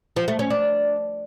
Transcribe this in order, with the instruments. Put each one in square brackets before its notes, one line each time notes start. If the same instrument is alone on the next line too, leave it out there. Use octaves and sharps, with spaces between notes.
[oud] F3
A3
C#4
D4